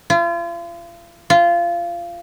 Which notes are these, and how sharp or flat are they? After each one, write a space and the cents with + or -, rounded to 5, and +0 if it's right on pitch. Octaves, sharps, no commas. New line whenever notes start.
F4 -40
F4 -20